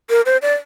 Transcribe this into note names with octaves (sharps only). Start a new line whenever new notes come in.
A#4
C5
D5